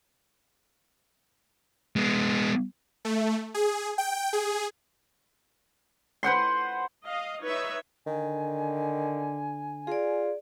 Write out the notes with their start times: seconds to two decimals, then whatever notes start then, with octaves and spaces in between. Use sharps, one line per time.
1.96 G#3 B3
3.05 A3
3.54 G#4
3.98 G5
4.33 G#4
6.23 B4 C5 F#5 C6
7.05 D#5 F5
7.43 D#4 B4 C#5 E5
8.07 D3 D#3 G#5
9.87 F4 G#4 D5